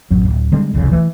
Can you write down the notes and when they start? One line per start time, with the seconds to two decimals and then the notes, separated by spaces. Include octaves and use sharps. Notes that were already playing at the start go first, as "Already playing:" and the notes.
0.10 A1 F2 F#3
0.25 D1
0.52 D3 G3 G#3 C4
0.73 D#1 C2 F2 C#3
0.92 E3 A3